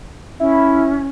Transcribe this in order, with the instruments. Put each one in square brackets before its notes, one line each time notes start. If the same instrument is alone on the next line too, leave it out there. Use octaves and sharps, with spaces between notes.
[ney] C#4 [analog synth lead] E4